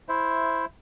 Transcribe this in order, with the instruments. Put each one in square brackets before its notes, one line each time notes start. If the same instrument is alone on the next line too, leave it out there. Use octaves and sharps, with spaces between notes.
[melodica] E4 C5 E5